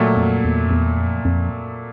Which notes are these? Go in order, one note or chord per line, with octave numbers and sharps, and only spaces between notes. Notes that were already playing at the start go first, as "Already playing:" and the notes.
Already playing: A#2 F#3 A3
F2
E2
F2
E2
F2
F2